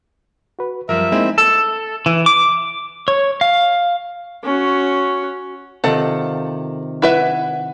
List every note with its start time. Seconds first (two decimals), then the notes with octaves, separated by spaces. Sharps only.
0.59 F#4 B4
0.89 F#2 F3 G3 A#4 E5
1.12 G#3 A#3 C4 D#4 E4
1.38 A4
2.06 E3
2.26 D6
3.08 C#5
3.41 F5
4.44 C#4 F#4
5.84 C3 D#3 F4 A4 F#5
7.02 E4 B4 E5 F#5